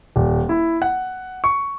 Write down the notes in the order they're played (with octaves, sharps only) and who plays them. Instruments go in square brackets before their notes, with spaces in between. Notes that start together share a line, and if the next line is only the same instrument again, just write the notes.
[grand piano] D#1
E4
F#5
C#6